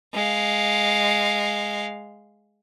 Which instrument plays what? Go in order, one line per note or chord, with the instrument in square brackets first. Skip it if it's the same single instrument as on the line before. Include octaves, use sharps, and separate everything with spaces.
[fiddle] G#3 F5